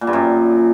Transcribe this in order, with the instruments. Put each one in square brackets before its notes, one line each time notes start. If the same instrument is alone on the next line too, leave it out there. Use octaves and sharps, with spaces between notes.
[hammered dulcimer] A#2
G2
F#2